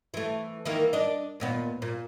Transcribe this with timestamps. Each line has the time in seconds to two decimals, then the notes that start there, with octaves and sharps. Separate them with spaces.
0.14 E3 A3
0.65 D#3 E3 A#3
0.93 D4 D#5
1.40 D#2 A#2 B3
1.82 A#2